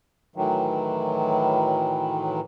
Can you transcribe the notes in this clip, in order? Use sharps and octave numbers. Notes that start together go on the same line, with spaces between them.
A2 D#3 E3 F#3